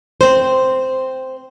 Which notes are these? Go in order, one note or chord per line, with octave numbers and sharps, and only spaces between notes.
C4 C5